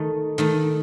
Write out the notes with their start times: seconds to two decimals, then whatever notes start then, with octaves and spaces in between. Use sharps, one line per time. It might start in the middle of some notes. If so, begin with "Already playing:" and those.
Already playing: D#3 A3 D#4
0.38 D#3 A3 D#4